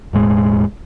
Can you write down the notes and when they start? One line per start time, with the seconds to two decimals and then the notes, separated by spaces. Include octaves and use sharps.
0.13 E1 A2 G#3